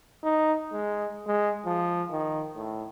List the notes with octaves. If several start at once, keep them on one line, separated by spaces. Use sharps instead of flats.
D#4
G#3
G#3
F3
D#3
A2